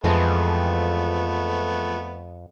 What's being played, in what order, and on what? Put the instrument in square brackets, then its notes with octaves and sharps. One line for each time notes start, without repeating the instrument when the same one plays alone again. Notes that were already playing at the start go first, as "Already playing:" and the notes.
[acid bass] F2 [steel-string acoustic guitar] E3 F3 G#3 [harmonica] A3 B3